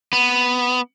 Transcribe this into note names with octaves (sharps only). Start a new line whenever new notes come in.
B3